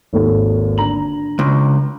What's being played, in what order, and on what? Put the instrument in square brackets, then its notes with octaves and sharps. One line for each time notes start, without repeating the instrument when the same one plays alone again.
[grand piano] G#1 D#2 A4
D3 A#5 F#7
[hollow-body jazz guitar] C#2